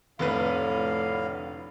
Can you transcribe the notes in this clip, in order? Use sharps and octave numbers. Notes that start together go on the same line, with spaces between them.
F1 A2 D3 B3 B4 F5